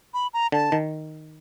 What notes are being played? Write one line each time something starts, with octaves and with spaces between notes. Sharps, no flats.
B5
A#5
D3 A5
D#3